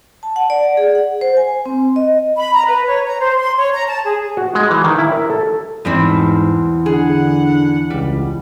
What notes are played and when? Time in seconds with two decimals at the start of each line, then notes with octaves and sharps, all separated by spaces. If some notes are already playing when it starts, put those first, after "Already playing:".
0.23 A5
0.36 F#5
0.50 D5
0.77 G#4
0.95 F#5
1.21 C5
1.37 G#5
1.66 C4
1.96 D#5
2.37 B5
2.54 A#5
2.67 B4
2.87 C#5
3.06 A#5
3.21 C5
3.38 C6
3.58 C#5
3.74 A#5
3.88 A5
4.05 G#4
4.37 F#4
4.55 G#3
4.70 E3
4.84 D#3
4.98 E4
5.12 A#4
5.30 A4
5.85 E2 G#2 B2 G3 C4 D6
6.86 D3 D4 G#4 F#5
7.90 C#2 G3